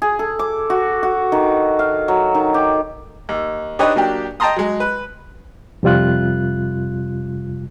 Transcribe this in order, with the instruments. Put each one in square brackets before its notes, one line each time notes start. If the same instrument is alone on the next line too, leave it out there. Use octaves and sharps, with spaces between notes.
[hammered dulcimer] G#4
A4
D6
F#4
F#4
D#3
F5
F#3
D#3
G4
[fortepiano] D#2
D4 D#4 G4 B4 C#5 D#5
F#3 A#3 D4 G4
D#5 G5 A5 A#5 C6 D#6
F#3 G#3
B4
[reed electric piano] F2 C3 G3 F4 F#6